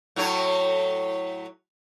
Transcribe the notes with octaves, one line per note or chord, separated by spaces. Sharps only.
A2 F#3 C#5